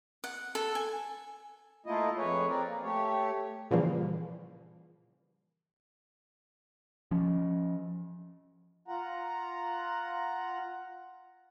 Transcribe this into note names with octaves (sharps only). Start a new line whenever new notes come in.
F#5
A4
G#5
A3 A#3 E4 F4 D#5
F2 G#4 B4 C#5
C4 A#4 D5
A#3
A3 G4 C#5
A#2 C#3 E3 F3 G3 A#3
F3 C#4
F4 F#5 A#5